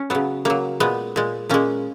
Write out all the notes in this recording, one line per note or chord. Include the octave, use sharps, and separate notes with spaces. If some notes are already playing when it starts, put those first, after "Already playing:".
Already playing: C#4
C#3 F#3 B3
C#3 F#3 A#3
A#2 G#3 B3
A#2 G#3
A#2 G#3 A#3 C#4